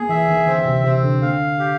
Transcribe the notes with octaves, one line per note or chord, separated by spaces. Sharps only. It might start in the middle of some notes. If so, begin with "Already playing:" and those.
Already playing: A#3 G#4
E3 E5
D#3
D3 C4
C3
C3 C4
D3
D3 F5
G4